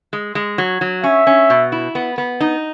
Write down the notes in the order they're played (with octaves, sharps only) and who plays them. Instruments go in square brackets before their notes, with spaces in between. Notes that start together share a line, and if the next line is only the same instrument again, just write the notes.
[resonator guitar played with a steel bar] G#3
G#3
F#3
F#3
[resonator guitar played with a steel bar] C#4 [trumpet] E5
[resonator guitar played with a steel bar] C#4
B2
E4
B3
B3
D#4